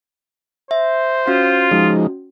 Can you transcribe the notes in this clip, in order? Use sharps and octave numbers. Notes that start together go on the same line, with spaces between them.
C5 E5
C#4 F4 F#4
F3 G#3 D#4